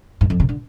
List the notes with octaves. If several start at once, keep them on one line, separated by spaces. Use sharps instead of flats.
G2
F2
C3
D3